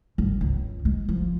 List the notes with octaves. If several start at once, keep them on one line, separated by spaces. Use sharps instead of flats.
G1
C#2
G#3
F3